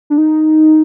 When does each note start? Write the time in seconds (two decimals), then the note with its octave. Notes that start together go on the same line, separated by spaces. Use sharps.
0.10 D4
0.18 D#4